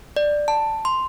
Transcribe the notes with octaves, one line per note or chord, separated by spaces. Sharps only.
D5
A5
C6